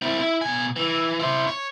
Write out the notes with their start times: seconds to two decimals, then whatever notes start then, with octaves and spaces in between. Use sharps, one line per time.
0.02 C4 E4
0.19 E4
0.42 B2 G#5
0.76 E3
1.20 E4 C5
1.47 C#5